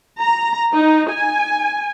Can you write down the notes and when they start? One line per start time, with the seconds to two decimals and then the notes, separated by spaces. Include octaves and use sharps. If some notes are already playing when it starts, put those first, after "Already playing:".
0.19 A#5
0.74 D#4
1.11 G#5